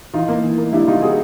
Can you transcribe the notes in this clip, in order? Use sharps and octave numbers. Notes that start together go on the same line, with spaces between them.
E3 D#4 F4
A#3
E3
A#3
G3 D4 E4
C3 D#4 F4
C3 F#4 G#4